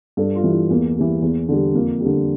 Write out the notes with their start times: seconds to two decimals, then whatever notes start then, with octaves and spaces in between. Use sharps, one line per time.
0.17 G2 A4
0.35 F4
0.44 E3 G3
0.52 E4
0.70 E2 A#3
0.95 G3
1.01 E3
1.22 E2
1.49 D3 G3
1.74 F2 A#3
2.00 G3
2.06 D3